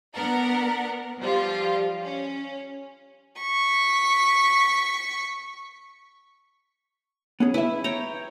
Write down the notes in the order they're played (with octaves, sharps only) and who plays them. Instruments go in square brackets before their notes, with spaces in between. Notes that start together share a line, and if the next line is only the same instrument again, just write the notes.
[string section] B3 D4 A#4 F#5
F3 G3 F4
C#4
[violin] C#6 B6
[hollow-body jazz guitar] B3 C#4 G#4
[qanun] E4 [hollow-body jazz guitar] B4 E5
[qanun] C#5 G5 A#5